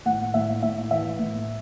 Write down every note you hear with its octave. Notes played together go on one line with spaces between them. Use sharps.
A2 F#5
A2 E5
A2 E5
E3 E5
A2